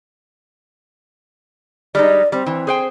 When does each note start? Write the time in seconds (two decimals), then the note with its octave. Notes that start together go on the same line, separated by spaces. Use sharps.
1.95 G3 G#3 D#4 D5
2.32 G3 C4
2.46 E3
2.67 G#4 C5 G5